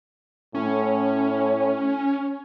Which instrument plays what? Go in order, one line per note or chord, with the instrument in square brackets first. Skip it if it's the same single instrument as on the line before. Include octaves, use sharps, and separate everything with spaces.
[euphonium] A2 [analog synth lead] C#4